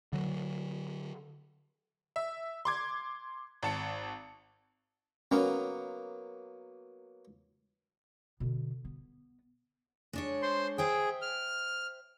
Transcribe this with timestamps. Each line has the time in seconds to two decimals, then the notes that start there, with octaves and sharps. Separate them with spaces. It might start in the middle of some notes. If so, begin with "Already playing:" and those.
0.13 D3 F#3
2.16 E5
2.65 C6 D6 G#6
3.63 G#1 A5 C#7
5.31 F#3 A#3 B3 C#4
8.40 B2 D3
8.85 B3
10.13 G#3 D4 C#5
10.42 C5 C6
10.78 G#4 C5 E5 G5
11.22 F6